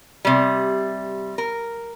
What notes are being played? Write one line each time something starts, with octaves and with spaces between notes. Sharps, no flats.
C3 G3
A#4